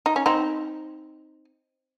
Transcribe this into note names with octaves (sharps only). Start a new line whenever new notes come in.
D#4
C#4
C4 D#4